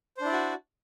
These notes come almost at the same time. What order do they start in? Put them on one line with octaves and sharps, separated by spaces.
C5 D4 E4 D5 F#4